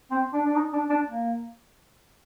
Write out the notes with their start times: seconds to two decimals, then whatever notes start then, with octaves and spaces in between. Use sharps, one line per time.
0.11 C4
0.33 D4
0.45 D4
0.56 D#4
0.73 D4
0.90 D4
1.07 A#3